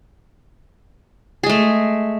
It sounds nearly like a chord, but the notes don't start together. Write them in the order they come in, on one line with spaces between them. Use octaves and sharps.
G#4 G#3 A3